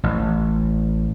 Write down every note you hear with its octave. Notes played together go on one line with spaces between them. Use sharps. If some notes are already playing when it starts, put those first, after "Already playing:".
A1